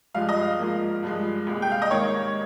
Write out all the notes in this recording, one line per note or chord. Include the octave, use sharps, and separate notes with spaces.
G2 F3 G#3 F5
D#5
F5
G#2 F3 A#3
G2 F3 G#3
C2 A#2 G#3
G5
F5
D#5
G#2 D#3 A#3 C#5